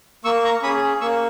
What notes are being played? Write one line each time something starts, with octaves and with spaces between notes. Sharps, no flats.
A#3 C#6 E6
A#5 C#6
C#4 G#4 B5 D#6
A#3 C#6 E6